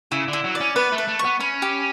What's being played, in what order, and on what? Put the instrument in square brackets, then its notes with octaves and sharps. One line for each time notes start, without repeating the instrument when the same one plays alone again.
[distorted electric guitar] C#3 [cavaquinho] E4
[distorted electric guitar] D3
[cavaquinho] E4
[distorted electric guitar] F#3
[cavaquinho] D5
[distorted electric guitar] C#4
[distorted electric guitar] B3 [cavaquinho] B4
[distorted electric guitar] A3
[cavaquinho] B4
[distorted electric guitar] A3
[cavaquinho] C#6
[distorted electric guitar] B3
[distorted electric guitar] C#4 [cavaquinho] B5
[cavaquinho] G4